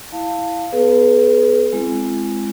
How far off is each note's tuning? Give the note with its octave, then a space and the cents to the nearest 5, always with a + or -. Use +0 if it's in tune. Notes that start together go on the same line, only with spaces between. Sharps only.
E4 +0 F5 +0 A5 +20
B3 +5 G#4 +40 B4 +0
G#3 +0 C4 +0 E4 +45